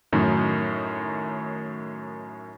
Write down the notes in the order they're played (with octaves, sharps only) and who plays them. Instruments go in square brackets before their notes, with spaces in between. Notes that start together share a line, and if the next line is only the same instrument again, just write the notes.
[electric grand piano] F#2 A2 D#3